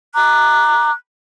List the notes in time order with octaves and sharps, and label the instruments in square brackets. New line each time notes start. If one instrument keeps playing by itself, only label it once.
[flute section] A#5 D6 F#6